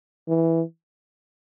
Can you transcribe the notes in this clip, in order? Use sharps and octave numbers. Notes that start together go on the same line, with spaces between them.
E3